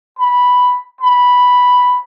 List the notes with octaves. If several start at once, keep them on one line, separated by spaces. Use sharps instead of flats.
B5
B5